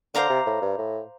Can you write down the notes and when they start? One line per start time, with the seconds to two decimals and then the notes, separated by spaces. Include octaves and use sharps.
0.15 D3 C5 F5 A#5 D6
0.30 C3
0.46 A2
0.62 G2
0.78 A2